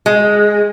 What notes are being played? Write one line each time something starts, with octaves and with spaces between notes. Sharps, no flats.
G#3